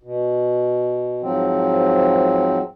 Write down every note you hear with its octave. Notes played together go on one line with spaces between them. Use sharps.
B2
G#2 F3 F#3 C4